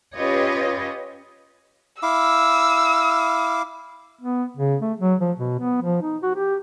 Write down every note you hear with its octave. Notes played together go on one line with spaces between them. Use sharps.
C#4 F4 G4 B4 C#5 D#5
E4 F5 D6 E6
B3
C#3
A3
F#3
F3
B2
B3
F3
D#4
F#4
G4